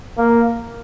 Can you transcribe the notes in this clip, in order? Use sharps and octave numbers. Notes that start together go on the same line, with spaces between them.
A#3